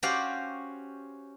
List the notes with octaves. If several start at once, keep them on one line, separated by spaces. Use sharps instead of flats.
C#4 F#4 G4 C5 D5 F5